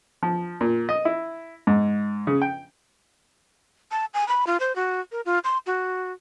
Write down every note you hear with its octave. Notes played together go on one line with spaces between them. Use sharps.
F3
A#2
D#5
E4
G#2
C#3
G5
A5
G#5
B5
F4
C5
F#4
A#4
F4
C6
F#4